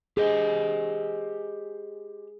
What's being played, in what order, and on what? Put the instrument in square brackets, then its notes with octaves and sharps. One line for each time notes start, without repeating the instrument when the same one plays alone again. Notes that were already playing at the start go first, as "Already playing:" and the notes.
[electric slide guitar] G4 C5 D#5 [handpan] G#4